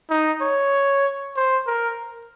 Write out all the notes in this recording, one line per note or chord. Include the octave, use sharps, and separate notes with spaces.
D#4
C#5
C5
A#4